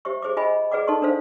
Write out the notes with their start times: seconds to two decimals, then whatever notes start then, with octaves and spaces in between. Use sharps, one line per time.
0.05 G4 C5 E5 C#6
0.22 G#4 C5 E5 D6
0.37 F4 D#5 G#5 B5
0.71 G#4 B4 D5 F#5 D6
0.87 D#4 A4 D5 C6 C#6
1.02 D4 A4 C5 F5